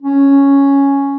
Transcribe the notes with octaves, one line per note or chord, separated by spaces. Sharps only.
C#4